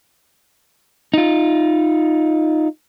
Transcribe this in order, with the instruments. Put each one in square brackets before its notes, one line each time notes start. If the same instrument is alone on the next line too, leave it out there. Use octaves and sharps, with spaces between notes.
[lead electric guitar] D#4 F4